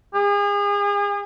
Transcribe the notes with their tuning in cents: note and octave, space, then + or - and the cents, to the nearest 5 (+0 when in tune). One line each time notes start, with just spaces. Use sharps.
G#4 -35